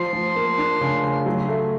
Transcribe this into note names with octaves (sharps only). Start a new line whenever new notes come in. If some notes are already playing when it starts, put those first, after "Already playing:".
Already playing: F3 C6
F3
A#3
D4
C#3
C#3
F#3
A3